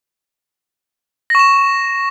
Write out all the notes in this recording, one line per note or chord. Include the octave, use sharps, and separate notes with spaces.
C#6 A#6 E7